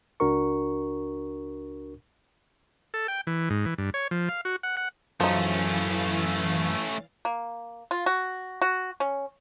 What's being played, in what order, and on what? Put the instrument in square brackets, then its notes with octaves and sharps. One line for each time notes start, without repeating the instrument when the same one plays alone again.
[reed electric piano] C#2 D4 F#4 A#4 C#6
[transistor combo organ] A4
G5
E3
G#2
E3
G2
C#5
F3
F5
F#4
F#5
F#5
[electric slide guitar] F#2 [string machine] E3 F5 A6 [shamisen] F3 D#4 [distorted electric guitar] A3 C#4
[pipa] A#3
F4
F#4
F#4
C#4